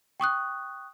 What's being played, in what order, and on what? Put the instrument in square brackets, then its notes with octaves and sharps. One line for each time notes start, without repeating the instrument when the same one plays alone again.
[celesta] G5 C#6 D#6 F#6